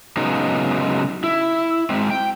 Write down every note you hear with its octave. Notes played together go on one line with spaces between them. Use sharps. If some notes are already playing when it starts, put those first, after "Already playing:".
C#3 F#3 G#3 B3 D#4
E4
G#3 C4
G5